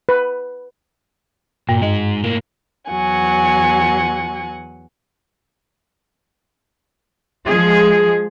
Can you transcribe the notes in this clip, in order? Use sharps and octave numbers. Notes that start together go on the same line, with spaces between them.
B4
G2 A#2
G#2 G#3 D#5
A2 A#3
E2 F#3 F#5 G#5
F3 G#3 G#4